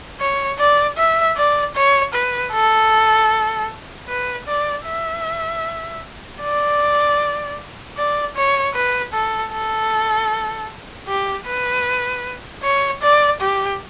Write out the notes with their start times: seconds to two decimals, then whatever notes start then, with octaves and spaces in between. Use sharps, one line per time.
0.20 C#5
0.59 D5
0.97 E5
1.36 D5
1.75 C#5
2.14 B4
2.53 A4
4.08 B4
4.47 D5
4.86 E5
6.41 D5
7.97 D5
8.36 C#5
8.75 B4
9.13 A4
9.52 A4
11.08 G4
11.46 B4
12.63 C#5
13.02 D5
13.41 G4